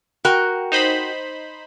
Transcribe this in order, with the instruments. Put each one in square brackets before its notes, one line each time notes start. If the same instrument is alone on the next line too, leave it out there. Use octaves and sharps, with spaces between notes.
[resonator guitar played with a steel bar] F#4 A#4 G5
[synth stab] D#4 C5 B5